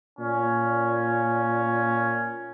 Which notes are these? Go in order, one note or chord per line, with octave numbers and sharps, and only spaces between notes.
A#2 C#4